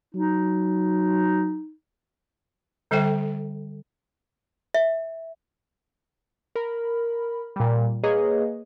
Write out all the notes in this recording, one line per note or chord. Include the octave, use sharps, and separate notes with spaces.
F#3 D#4
D3 G3 A4 C5 E5 G5
E5
A#4 B5
A#2 G3
A#3 G#4 B4 C#5 D#5